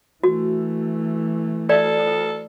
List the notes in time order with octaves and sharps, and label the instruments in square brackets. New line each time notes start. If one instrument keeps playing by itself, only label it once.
[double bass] E3 A3 [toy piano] F#4
[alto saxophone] A4 [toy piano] D5